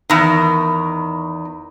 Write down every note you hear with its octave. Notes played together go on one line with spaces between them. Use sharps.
E2 D#3